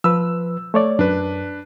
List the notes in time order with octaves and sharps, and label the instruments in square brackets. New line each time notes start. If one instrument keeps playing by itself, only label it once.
[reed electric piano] F3 B4 [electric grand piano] E6
[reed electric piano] A3 C#5 D5
[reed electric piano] F#2 [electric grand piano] D4 B4